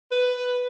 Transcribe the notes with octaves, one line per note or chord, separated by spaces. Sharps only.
B4